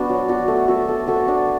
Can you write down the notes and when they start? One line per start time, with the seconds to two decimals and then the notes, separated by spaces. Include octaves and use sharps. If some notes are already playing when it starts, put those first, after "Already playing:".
Already playing: B3 D4 F#4
0.09 F#3
0.28 D4 F#4
0.48 A3
0.68 F#4 A4 E5
0.88 A3
1.07 F#4 A4 E5
1.28 D4